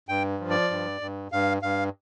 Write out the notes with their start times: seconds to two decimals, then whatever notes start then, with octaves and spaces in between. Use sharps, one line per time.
0.09 G2 G5
0.40 F3
0.50 D5
0.70 G2
1.01 G2
1.32 G2 F5
1.63 G2 F5